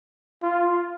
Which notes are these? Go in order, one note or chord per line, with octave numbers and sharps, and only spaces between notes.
F4